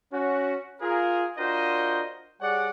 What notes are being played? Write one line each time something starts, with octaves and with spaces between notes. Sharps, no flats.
C#4 F#4
F4 G#4 A#4
D4 F4 F#4 A#4 C5 D#5
G3 G#4 C#5 D5 F#5